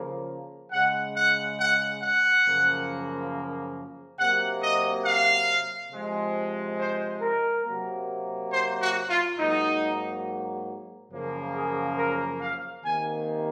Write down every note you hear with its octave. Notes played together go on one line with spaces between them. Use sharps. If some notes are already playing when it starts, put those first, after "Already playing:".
Already playing: C#3 F3 A#3
C#3 G#3 F#5
F#5
F#5
F#5
F#2 C#3 F3 A#3
C3 F#3 A#3 F#5
D#5
F5
C3 F3 G#3
C5
A#4
C3 F#3 A#3
C5
F#4
F4
G#2 F#3 A#3 D#4
F#2 C#3 F3 A#3
G#4
A#4
F5
C3 D#3 A#3 G#5